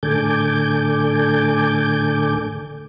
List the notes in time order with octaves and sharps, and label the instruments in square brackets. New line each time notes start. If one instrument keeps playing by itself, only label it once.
[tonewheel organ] A2 D3 A4 G#5 D6 G6